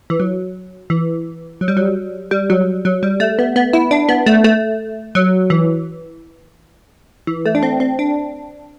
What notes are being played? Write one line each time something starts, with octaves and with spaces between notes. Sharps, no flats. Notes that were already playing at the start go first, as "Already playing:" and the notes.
E3
F#3
E3
F#3
G3
F#3
G3
F#3
F#3
G3
A3
B3
B3
E4
D4
B3
A3
A3
F#3
E3
E3
A3
D4
C4
C4
D4